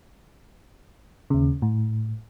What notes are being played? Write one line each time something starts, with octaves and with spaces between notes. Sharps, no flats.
D#2 C#3
A2